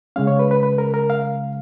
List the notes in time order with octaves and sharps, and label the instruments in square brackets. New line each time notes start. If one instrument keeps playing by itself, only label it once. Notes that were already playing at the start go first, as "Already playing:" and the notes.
[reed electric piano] C#3 G#3 C#4 F5
C#5
B4
B4
B4
A#4
A#4
F5